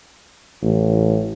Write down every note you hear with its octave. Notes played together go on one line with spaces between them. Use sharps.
A1